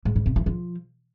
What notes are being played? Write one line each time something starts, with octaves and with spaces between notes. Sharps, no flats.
G#2
G#2
C3
E3
F3